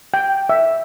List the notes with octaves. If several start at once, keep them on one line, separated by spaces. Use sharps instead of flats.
G5
E5